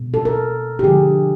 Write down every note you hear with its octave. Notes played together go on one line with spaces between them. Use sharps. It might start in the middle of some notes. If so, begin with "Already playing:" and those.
Already playing: B2 G#3
A4
A#4
G4
D3 F3 G#3 G#4